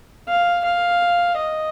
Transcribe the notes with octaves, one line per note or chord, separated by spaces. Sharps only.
F5
F5
D#5